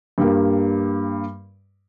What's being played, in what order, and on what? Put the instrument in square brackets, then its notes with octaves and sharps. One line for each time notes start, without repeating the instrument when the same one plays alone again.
[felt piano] G2 G3 A#3